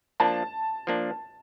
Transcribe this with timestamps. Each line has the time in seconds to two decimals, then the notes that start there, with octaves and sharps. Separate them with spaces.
0.20 F3 A#3 D4 A5
0.87 F3 A#3 D4